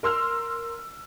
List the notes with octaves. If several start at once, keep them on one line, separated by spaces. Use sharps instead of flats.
A#4 C6 E6 F6